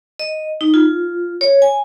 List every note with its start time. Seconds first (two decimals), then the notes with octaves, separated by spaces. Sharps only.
0.19 D#5
0.61 D#4
0.74 F4
1.41 C#5
1.62 G#5